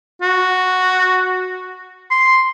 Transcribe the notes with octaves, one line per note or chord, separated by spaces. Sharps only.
F#4
C6